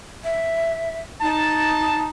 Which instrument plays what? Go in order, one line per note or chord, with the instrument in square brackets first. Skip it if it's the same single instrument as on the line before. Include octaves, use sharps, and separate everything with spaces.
[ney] E5
[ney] D#4 [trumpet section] A5